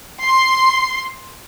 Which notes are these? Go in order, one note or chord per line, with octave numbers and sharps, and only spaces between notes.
C6